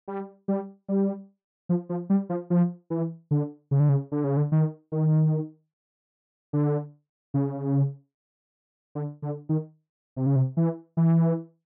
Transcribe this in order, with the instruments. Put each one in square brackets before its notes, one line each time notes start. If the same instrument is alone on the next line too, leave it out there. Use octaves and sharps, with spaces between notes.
[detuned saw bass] G3
G3
G3
F3
F3
G3
F3
F3
E3
D3
C#3
D3
C#3
D3
C#3
D3
D#3
D#3
D3
C#3
D3
D3
D#3
C3
C#3
C3
E3
E3